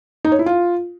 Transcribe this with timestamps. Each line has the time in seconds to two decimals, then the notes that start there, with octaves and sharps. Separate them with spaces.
0.25 D#4
0.32 C#5
0.39 E4
0.46 F4